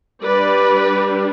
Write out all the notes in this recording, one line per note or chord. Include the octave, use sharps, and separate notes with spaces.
G3 D4 B4 D5